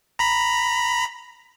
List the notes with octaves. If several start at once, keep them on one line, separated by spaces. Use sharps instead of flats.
A#5 B5